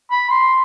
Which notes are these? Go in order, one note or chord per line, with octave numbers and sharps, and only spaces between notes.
B5
C6